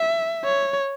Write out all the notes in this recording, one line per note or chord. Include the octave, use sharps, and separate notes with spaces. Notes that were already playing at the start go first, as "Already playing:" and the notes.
Already playing: E5
C#5